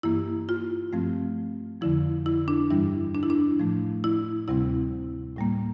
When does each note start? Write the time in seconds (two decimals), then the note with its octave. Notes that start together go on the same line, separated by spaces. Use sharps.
0.03 G2 E3 A#3 E4
0.49 F4
0.93 G2 F3 A3 C4
1.81 F2 D3 F3 E4
2.26 E4
2.48 D4
2.70 G2 E3 G3 E4
3.15 D4
3.23 E4
3.30 D4
3.60 A2 F3 A3
4.04 E4
4.48 D2 C3 G3 C4 E4
5.36 A2 G3 A#3